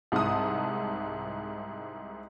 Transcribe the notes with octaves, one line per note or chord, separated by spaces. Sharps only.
C2 G#2 E4 A5 D#6